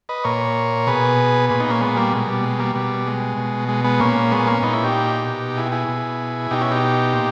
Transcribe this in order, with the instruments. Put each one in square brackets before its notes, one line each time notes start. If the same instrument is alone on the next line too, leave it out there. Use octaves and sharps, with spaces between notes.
[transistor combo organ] B4 D#5
A#2 A#4 C#5
B2 G#4 B4
A#2 G#4 B4
B3 D#4
A#3 C#4
G#3 B3
G3 A#3
B2 G#3
G3
G#3
G3 A#3
B2 G3
G#3
B2
G#3
G#3 B3
A#2 A#3 C#4
G#3 B3
A#3 C#4
A#2 B3 D#4
C#4 E4
D#4 G4
B2
E4 G#4
E4 G#4
B2
B2 D#4 G4
C#4 E4
D#4 G4
A#2